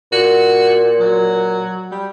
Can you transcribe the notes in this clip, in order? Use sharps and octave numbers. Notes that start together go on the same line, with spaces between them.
A#2 F#4
F#3
G3